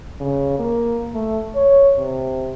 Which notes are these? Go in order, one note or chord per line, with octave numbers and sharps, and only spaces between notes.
C#3
A#3
A3
C#5
C3